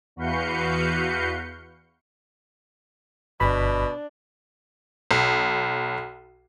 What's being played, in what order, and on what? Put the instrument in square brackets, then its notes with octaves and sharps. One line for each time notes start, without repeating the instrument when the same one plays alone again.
[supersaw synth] E2 F#4 B4 F5 G6 C#7
[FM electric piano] G1 B5 [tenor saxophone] B2 [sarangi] D4
[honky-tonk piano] B1